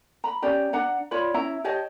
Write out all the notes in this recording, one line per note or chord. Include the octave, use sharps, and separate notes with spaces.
A#5 B5
C#4 G4 D5 A#5
D4 F#5 A#5
F4 C#5 D5 B5
C#4 E4 E5 A#5
G4 C#5 D#5 A5